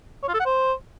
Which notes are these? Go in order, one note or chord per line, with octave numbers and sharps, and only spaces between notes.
C#5
F4
A4
F#5
C5